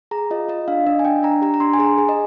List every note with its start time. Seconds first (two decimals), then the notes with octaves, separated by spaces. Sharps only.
0.11 G#4 A#5
0.31 F4 D#5
0.48 F4 D#5
0.68 D4 F5
0.86 D4 D#5
0.99 G#5
1.05 D4 G5
1.23 D4 A#5
1.42 G4 A#5
1.54 A#5
1.60 D4 C6
1.74 G#5
1.79 G#4 A#5
1.98 G#4 G#5
2.09 D#5